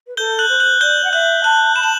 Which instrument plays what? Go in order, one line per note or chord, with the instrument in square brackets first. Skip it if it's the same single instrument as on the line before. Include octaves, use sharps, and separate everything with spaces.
[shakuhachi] B4
[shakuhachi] A4 [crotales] G6 G7
[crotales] F#6 F#7
[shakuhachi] C5
[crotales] F#6 F#7
[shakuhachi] D5 [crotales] G6 G7
[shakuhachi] F#5
[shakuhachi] E5 [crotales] F#6 F#7
[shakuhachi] A5 [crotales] F#6 F#7
[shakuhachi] B5 [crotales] E7
[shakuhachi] A5 [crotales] F#7